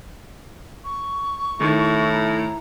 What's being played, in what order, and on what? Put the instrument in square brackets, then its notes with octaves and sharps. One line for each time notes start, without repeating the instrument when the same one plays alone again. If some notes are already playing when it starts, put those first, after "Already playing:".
[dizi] C#6
[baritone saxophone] A2 [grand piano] D#3 [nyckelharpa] E4
[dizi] A#5